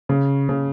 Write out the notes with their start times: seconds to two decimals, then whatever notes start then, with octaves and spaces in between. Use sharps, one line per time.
0.09 C#3
0.49 C#3